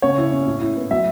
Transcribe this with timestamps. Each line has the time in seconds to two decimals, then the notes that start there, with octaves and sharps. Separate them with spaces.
0.02 C#3 C#5
0.18 E4
0.31 C#4
0.47 A2
0.61 E4
0.77 B3
0.91 F#3 E5